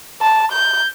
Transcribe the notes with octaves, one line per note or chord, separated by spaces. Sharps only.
A5
G6